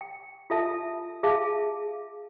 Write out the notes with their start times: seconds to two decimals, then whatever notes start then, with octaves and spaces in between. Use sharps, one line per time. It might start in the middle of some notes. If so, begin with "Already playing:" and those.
0.01 G5
0.50 F4 A4 E5 A5
1.23 G#4 E5 F5 A5